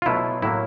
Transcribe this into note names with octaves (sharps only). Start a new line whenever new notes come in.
F4
B2 F#3 A3 E4
A2 F#3 A#3 E4